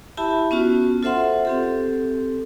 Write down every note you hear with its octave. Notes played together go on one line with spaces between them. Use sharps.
E4 G4 E5 A5 B5
B3 C#4 F4 F#4
F4 A4 C5 E5 F#5 C6
C4 G4 A4